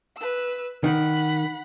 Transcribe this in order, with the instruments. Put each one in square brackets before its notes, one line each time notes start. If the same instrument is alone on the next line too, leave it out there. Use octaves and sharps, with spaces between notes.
[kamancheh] B4 E6
[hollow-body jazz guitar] D#3 [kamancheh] F#5 B5